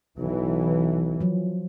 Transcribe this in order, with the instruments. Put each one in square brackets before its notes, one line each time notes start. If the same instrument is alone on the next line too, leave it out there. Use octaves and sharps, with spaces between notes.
[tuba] B1 [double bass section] E3
[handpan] F3 F#3